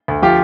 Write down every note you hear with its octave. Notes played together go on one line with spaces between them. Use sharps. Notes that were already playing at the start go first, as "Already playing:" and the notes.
D2
F3 F4 G4